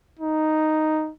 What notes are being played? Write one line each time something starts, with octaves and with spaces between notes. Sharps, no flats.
D#4